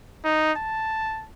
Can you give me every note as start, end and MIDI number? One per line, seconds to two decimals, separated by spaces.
0.25 0.52 63
0.57 1.27 81